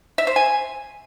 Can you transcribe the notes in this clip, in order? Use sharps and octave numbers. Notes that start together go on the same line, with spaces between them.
E5
C5
G#5